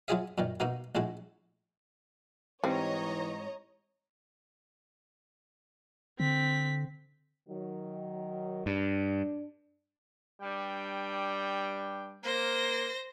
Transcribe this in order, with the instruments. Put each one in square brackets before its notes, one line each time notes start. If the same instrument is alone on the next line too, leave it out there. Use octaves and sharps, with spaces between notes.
[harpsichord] F#3 E4 F4 G#4 D#5 E5
F#2 A#2 D#3
B2 A#3 D#4 F#4
A#1 A2 G#3 E4 F#4
[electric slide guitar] G#2 D#4 [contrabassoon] E3 [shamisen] G3 C4 [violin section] C#5 D#5 A#5
[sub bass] D3 [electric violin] C4 B6
[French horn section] D#3 F#3
[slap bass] G2 [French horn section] D4
[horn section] G2 D4 G5 [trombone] G3
[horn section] A#3 [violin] C5 A#6